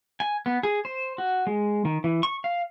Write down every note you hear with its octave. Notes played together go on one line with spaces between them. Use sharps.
G#5
B3
G#4
C5
F#4
G#3
D#3
E3
C#6
F5